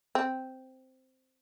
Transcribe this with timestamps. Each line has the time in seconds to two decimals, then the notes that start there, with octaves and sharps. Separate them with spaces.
0.15 C4